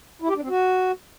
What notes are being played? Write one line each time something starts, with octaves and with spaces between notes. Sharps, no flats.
E4
G4
D4
C4
F#4